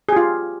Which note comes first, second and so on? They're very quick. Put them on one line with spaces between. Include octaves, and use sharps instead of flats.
G#4 G4 F4